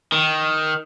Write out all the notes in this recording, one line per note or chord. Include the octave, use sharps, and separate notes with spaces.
D#3